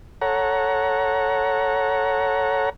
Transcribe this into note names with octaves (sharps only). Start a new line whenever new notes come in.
A4 C#5 F#5 A#5